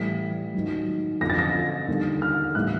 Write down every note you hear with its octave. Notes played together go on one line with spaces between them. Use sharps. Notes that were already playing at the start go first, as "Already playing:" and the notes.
Already playing: A2 E3 G3 B6
G#2 D#3 F#3
F2 D3 F3 A#6
A6
A#6
D#2 D3 G3
F6
A2 E3 G3 F#6